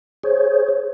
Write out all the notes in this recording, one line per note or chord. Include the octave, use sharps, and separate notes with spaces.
G#4 C5 C#5